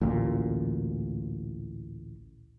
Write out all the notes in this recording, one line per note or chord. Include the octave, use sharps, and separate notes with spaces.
A1 D2 A#2